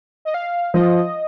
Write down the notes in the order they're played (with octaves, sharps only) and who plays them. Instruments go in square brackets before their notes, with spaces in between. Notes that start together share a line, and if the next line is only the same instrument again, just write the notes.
[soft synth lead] D#5
F5
[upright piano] F3 [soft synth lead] D#5